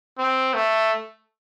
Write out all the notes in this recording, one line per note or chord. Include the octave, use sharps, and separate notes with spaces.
C4
A3